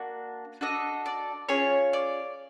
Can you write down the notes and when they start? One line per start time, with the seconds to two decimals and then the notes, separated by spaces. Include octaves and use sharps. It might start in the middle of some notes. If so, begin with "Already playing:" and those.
Already playing: A#3 D4 F#4
0.61 D4 F#4 A4 D#5
1.06 D5
1.49 C#4 F4 G#4 C#5
1.93 D5